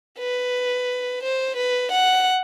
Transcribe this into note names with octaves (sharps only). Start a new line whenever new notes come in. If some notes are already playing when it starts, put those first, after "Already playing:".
B4
C5
B4
F#5